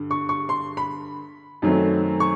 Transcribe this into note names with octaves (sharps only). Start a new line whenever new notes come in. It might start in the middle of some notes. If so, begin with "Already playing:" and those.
Already playing: G2 D3
C#6
C#6
C6
B5
F#2 D#3 F#3 A3 C4
C#6